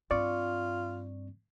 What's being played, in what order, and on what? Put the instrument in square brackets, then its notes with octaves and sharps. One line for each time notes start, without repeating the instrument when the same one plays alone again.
[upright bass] G2 C4 [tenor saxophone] F4 [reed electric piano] D5 C#6